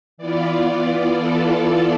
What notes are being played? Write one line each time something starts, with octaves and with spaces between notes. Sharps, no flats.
E3 B3 F4 D5
D5
A4